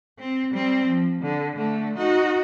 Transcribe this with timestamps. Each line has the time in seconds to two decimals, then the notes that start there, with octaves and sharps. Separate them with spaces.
0.19 C4
0.51 G3 C4
0.87 F3
1.21 D3
1.56 D3 A3
1.97 D#4 F#4